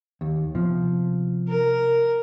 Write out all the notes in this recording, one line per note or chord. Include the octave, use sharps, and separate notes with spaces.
D#2
C3 F3 B3
A#4